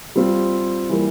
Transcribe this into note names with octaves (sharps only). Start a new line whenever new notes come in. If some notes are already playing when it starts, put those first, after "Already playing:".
G3 C4 F4
E3 G3 A#3